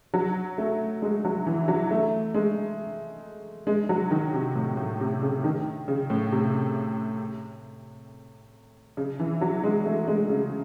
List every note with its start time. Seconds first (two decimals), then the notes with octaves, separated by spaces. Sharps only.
0.14 F#3
0.58 A3
1.02 G#3
1.25 F#3
1.46 E3
1.68 F#3
1.91 A3
2.34 G#3
3.67 G#3
3.89 F#3
4.11 D#3
4.34 C3
4.55 A2
4.77 A2
5.00 C3
5.22 C#3
5.44 D#3
5.88 C#3
6.10 A2
6.32 C3
8.97 C#3
9.19 E3
9.41 F#3
9.64 G#3
9.85 A3
10.08 G#3
10.29 C#3